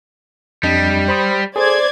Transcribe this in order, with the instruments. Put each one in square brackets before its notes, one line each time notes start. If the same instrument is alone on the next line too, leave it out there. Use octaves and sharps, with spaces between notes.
[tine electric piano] F2 D4 D#5 [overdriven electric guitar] G3
[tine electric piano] C5 B5 D#6
[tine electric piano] G#4 A4 [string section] C5 D5 G#6